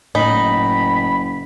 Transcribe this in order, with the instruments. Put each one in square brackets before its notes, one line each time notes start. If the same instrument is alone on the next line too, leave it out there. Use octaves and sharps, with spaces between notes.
[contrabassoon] F#1 [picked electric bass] A2 [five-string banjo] D#4 [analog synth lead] B5